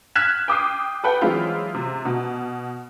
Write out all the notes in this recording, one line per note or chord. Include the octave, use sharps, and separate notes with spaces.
F6 F#6 G#6 B6 E7
G5 D6 D#6 C7
A4 B4 F#5 G5
E3 F#3 G#3 C4 E4 F4
C3
B2